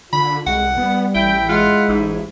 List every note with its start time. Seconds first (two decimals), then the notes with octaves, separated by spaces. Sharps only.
0.13 D3 F4 B5
0.47 C2 G#3 F#5
0.78 G3 B3
1.15 A1 E4 G5
1.49 G#3 F4 F#5
1.88 A1 G#2